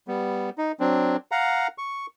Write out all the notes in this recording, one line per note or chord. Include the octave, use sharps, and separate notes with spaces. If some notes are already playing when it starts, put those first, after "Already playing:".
G3 B3
D#4
F#3 C4 D4
F5 F#5 A#5
C#6